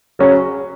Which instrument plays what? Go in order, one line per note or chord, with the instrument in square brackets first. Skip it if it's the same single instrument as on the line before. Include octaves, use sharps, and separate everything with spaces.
[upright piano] C#3 F#3 C#4